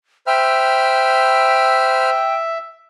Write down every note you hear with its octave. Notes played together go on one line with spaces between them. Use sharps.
C5 E5 G5 B5 F6